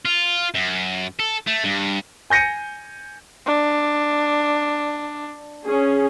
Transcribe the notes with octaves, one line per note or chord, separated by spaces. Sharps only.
F4
F#2
A4
A3
G2
G#5 G6 A#6 C#7 D#7
D4
C#4 G#4